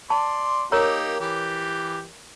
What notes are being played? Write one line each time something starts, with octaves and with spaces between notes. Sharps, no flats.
D5 A5 C6
A#3 D#4 G4 A#4 C#5 A#5
E3 G4